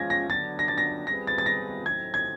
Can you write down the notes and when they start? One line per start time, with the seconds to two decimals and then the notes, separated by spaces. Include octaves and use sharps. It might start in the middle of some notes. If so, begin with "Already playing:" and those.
Already playing: F3 G#3 C#4 F4 G#6 A#6
0.10 A#6
0.29 D3 F#3 B3 D4 A6
0.59 A#6
0.68 A6
0.78 A#6
1.07 G3 C4 F4 G#4 B4 A#6
1.27 A6
1.38 A6
1.46 A#6
1.86 A2 F#3 A3 C4 D#4 G#6
2.14 G#6